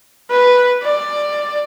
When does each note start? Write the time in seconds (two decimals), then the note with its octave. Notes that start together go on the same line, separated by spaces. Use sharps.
0.30 B4
0.83 D5